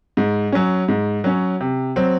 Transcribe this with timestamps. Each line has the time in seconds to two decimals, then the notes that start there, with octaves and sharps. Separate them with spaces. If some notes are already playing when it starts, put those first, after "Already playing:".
0.17 G#2
0.52 F#3 C#4
0.88 G#2
1.24 F#3 C#4
1.60 C3
1.96 F#3 C4